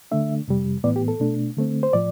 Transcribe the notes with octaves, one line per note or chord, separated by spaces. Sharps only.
D3 A3 D4 E5
F2 C3 G3
A2 E3 B3 D5
G4
A4
B2 A3 D4
D3 A3 C4
C5
A2 F3 D5